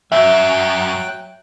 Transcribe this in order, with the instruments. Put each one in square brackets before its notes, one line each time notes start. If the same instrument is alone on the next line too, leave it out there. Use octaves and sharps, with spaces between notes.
[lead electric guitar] F#2 [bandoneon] F#3 G5 F#6 [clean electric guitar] E5